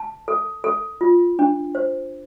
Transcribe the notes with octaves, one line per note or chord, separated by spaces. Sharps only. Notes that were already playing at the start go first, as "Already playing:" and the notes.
Already playing: A5
A4
A4
F4
D4
C5